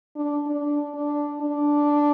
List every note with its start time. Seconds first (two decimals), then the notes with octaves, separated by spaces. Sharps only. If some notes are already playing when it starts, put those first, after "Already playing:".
0.16 D4
0.47 D4
0.95 D4
1.42 D4